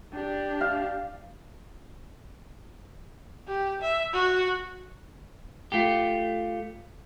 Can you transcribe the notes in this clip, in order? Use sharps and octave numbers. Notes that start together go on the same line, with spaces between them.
D4 G4
F5
G4
E5
F#4
A3 F4 G4